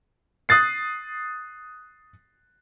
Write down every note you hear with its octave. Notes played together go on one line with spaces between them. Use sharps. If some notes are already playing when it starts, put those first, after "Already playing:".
D#6 F#6 A6 C7